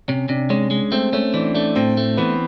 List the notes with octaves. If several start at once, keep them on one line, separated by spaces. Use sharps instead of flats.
C3 C#4
C3 D4
G#3 C#4
G#3
A3 C4
A3 C#4
E3 D4
A3 D4
A2 C4
A3
E3 B3